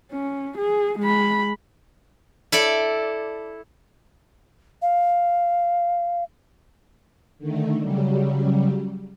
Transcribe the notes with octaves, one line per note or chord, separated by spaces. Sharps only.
C#4
G#4
G#3 B5
E4 A4 D5
F5
D3 D#3 A3
C#3 F#3 G3